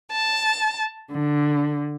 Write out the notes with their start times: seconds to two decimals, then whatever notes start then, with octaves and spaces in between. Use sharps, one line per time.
0.11 A5
1.11 D3